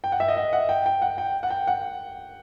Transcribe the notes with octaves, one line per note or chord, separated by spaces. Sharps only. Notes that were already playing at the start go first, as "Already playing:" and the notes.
G5
F#5
E5
D#5
E5
F#5
G5
G5
F#5
G5
F#5
G5
F#5